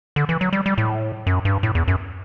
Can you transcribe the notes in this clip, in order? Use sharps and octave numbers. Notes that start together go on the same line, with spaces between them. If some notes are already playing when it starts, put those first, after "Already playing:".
D3
E3
F#3
G3
G3
A2
F#2
G2
A2
E2
F#2